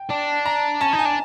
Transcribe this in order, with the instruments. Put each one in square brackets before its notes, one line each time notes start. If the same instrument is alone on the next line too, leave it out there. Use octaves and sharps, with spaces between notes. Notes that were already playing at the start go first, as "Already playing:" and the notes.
Already playing: [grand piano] G5
[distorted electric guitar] D4 [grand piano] A5
[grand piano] A#5
[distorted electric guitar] C#4 [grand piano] A5
[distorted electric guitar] D#4
[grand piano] G#5
[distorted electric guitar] D4